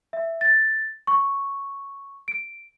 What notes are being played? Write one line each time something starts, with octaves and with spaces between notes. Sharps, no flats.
E5
A6
C#6
D7